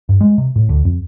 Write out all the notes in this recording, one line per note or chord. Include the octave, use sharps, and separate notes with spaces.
G2
G#3
C3
A2
D2
F2